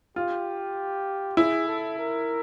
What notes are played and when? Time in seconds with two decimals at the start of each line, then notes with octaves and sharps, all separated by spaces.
0.16 F4 G4
1.37 E4 G#4
1.68 A4
1.99 A#4